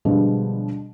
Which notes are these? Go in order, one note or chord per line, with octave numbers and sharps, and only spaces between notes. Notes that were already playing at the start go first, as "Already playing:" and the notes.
B2 D3 F3 G3 G#3